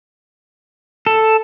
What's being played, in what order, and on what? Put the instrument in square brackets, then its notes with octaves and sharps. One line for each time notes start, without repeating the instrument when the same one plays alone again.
[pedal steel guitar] A4